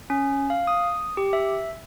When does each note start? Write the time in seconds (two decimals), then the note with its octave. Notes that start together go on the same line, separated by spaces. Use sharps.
0.10 C#4
0.50 F5
0.67 D#6
1.17 G4
1.33 E5